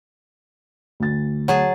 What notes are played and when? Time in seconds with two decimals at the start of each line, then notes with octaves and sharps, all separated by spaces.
1.00 D2 A6
1.48 F#3 G#4 A5